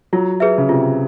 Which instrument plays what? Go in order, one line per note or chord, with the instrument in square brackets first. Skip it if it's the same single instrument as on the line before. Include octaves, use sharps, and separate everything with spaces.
[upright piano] F#3 [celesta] F4
[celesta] G#4 B4 E5
[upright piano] C#3
[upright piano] C3 [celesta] F4